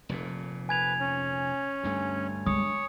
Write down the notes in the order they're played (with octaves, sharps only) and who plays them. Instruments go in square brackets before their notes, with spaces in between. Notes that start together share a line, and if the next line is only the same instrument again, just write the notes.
[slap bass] F1 F2 A#2
[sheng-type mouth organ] B4 [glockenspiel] G#5 G#6 F7
[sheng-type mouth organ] C#4
[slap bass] D2 G2 A3
[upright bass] G#3 D4 [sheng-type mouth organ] C#5 [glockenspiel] D#6